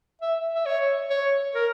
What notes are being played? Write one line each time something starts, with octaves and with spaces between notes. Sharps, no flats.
E5
E5
C#5
C#5
A#4